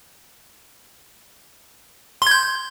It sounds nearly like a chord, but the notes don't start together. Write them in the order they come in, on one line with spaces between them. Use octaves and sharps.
C6 G#6 G6